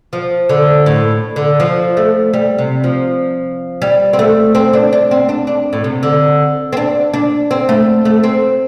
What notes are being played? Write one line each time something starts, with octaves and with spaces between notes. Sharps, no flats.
F3
D3
A2
D3
F3
A3
G3
C3
F3
G3
C4
A3
C4
D4
D4
C4
D4
D4
A2
C3
D3
C4
D4
D4
C4
A3
A3
C4